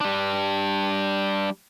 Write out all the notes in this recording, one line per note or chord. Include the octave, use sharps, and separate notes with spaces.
G3 D4